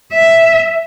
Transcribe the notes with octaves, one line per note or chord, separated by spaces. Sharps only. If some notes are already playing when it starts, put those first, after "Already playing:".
E5